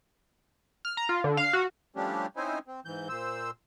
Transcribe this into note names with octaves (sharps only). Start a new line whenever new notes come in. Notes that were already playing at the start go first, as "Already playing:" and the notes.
F6
A#5
F4
D3
F5
F#4
F3 G3 A3 C#4 D4 G4
C4 C#4 D#4 E4 C5 G#5
C4
G#2 E3 G6
A#2 C5 E6